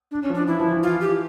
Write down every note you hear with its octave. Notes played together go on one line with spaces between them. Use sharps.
D4
C#4
F3 D4
E3 E4
F3
E3
F4
G4